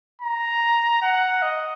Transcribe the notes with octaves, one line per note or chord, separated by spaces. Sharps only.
A#5
F#5
D#5